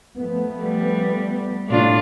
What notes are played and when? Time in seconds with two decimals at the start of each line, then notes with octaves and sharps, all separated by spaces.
0.17 F3 A3 B3
0.63 G3
1.68 A2 C3 D4 F4